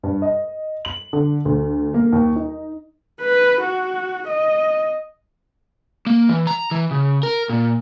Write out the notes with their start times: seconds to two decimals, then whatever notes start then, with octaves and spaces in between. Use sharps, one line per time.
0.03 G2
0.22 D#5
0.85 F#7
1.13 D3
1.45 D2
1.94 A#3
2.13 D#2
2.36 D#4
3.21 B4
3.61 F#4
4.28 D#5
6.07 A#3
6.29 E3
6.47 A#5
6.71 E3
6.91 C#3
7.23 A#4
7.50 A#2